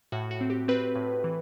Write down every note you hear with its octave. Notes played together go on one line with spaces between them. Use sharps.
A2 F#4
F#4
C4
G4
C4 B4
A2
E3